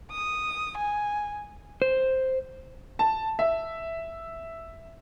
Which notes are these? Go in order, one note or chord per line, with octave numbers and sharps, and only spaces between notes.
D#6
G#5
C5
A5
E5